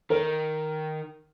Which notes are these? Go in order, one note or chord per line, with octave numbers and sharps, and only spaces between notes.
D#3 A#4